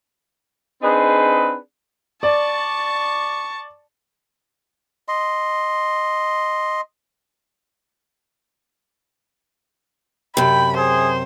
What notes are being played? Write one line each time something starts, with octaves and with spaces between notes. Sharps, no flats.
C4 D4 D#4 G#4 B4
D5 A5 C#6
D#5 C6
F#2 C3 G5 B5
G#4 C5